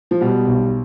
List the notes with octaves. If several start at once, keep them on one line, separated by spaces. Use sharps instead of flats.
F3
B2 G3
B1